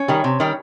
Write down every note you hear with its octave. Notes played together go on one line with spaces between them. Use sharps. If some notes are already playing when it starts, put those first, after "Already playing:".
Already playing: C#4
D#3 G3
C3
D#3 G3